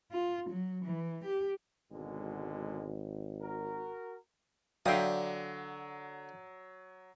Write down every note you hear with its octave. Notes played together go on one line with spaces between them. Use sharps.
F4
F#3
E3
G4
G#1 B2 D3 G#3
F#4 A#4
D3 F#3 D5 E5 F5 G5 D#6